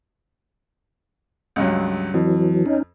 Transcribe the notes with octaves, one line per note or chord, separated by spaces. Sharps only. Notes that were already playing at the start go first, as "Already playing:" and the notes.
C#2 G2 F#3
F2 E3 F#3
C#4 D#4